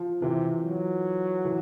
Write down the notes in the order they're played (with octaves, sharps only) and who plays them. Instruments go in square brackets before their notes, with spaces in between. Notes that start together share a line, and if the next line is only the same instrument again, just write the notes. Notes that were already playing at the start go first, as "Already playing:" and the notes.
Already playing: [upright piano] F3
[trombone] C3 [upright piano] E3
[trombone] F#3
[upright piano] E3